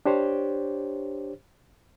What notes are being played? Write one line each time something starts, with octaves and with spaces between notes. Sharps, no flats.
D4 G4 C5 C#5